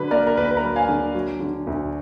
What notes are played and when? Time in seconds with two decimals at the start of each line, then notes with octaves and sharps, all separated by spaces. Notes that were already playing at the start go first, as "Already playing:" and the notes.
Already playing: D3 F#3 B4
0.11 A#3 A#4 D5
0.27 A#4
0.37 D2 B4
0.51 B4
0.57 A#4
0.63 F#3
0.76 F5 G#5
0.89 D3
1.14 F#3
1.40 D3
1.67 D2